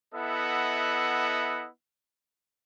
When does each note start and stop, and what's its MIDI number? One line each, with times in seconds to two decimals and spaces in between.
0.15 1.68 59
0.15 1.68 64
0.15 1.68 69
0.15 1.68 75
0.15 1.68 76
0.15 1.68 78